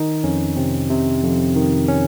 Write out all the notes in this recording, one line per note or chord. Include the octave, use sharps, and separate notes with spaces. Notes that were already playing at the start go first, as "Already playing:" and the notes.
Already playing: D#3 D#4
F2 C#4
C3 C4
C3
F2
D#3
C#4